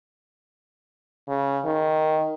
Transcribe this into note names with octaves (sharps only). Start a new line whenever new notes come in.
C#3
D#3